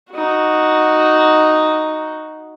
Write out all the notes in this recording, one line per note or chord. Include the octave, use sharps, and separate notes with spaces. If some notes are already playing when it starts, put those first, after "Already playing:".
D#4 F#4